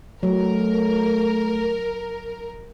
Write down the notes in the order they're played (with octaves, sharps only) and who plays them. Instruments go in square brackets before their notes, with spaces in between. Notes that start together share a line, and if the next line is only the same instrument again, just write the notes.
[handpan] F#3 [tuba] A3 [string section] A#4